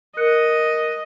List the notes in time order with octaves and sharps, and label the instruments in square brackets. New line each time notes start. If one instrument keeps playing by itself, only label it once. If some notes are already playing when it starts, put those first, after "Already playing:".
[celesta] A#4 F#6 C#7 [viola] D#5